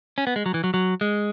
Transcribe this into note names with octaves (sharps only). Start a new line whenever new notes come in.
C#4
B3
G#3
F#3
E3
F#3
F#3
G#3